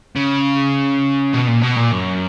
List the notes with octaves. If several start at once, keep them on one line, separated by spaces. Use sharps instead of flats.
C#3
B2
A#2
B2
A#2
F#2